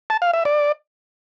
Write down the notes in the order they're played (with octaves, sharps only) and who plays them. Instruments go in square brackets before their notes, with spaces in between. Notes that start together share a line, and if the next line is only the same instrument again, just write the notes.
[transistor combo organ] A5
F5
E5
D5